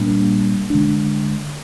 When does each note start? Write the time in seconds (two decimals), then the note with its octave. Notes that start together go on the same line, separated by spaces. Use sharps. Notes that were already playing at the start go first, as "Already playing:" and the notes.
Already playing: A#2 G3 A#3 D4
0.70 D3 G#3 D4